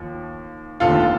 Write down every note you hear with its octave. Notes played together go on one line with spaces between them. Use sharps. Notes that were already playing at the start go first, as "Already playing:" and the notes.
Already playing: D#2 F3
F1 D#2 D3 F4 A4